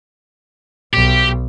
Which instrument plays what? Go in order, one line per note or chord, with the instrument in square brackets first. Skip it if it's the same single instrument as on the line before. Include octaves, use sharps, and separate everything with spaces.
[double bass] B1 [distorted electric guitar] G4